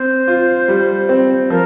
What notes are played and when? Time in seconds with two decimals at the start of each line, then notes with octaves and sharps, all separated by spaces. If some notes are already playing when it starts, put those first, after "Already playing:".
Already playing: C4 C5
0.28 F4
0.68 G3
1.09 C4
1.50 F3 A#4